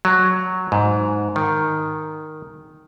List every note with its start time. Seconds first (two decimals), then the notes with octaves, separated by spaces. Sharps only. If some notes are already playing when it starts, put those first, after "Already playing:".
0.05 F#3
0.72 G#2
1.36 D#3